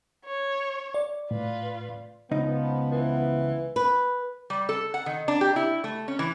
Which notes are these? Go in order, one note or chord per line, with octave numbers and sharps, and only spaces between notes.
C#5
D5
A2 F4 B4
C#2 F3 B3 D#4
E3
B4
G3
A4
F#5
D#3
D4
G4
E4
A3
C#4
E3